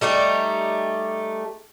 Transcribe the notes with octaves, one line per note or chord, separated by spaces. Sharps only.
G3 A3 D#4 G4